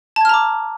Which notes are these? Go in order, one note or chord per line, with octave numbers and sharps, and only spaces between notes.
A5 A#5 D6 F6 G#6